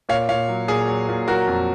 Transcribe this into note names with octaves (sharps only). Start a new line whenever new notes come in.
A#2 C#5 F5
A#2 C#5 F5
F#3
A#2 G#4
F#3
A#2
F#3 F#4 A#4
F2